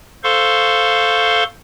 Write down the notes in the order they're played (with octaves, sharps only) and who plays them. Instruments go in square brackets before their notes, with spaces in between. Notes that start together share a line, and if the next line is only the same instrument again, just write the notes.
[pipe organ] A4 C5 F5 C6 C#6